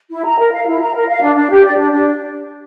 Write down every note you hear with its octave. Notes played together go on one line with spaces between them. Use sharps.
E4
A#5
A#4
F5
E4
A#5
A#4
F5
D4
D4
G4
D5
D4
D4